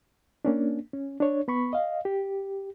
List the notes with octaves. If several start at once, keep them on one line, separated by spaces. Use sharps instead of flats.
A#3 C#4 D4
C#4
D4 C#5
B3 B5 C#6
D#5 F5
G4